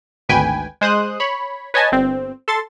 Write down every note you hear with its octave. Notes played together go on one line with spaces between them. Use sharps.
G#1 D2 B4 G5 G#5 G#6
G#3 C5 D#6 F#6
C#5 B5
B4 C#5 D#5 G#5 A5
G1 C4
A4 C6 A6